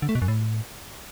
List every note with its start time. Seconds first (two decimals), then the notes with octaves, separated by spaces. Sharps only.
0.02 D3
0.09 A3
0.15 B2
0.22 F#2
0.28 A2